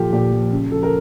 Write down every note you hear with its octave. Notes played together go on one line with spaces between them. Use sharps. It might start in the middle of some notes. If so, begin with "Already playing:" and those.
Already playing: A#2 F3 F4 G4 A4
A#2 G4
F3
C#3
F3 A4
A#4